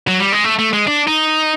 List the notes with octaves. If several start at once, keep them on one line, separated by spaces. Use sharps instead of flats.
F#3
G3
G#3
A3
A3
G#3
D4
D#4